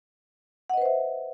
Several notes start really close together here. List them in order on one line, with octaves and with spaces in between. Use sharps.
F#5 D#5 B4 C5 E5